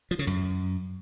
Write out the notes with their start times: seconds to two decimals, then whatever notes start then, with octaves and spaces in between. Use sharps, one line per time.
0.11 F3
0.19 C#3
0.27 F#2